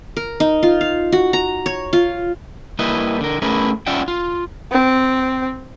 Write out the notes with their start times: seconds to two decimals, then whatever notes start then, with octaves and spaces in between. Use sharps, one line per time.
0.17 A#4
0.40 D#4
0.63 F4
0.81 F5
1.12 F#4
1.33 A#5
1.66 C#5
1.93 F4
2.79 G3 A#3 E4 B4 D#5
3.20 D3 A#4
3.42 A3 C#4 E4 G#4 A#4 B4
3.86 C#4 F4 D5 E5 F#5 G5
4.08 F4
4.72 C4